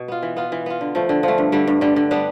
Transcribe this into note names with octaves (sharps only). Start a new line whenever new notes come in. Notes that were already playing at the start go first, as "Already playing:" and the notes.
Already playing: B2
B3 F4
E3
B3 F4
E3
B3 F4
D3
F3 A3
D3
F3 A3
G2
D3 G3
G2
D3 G3
D3
G3 B3 D4